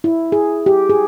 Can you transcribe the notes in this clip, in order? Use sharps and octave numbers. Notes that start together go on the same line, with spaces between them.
E4
G#4
G4
G#4